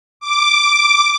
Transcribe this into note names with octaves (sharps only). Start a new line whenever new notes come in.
D6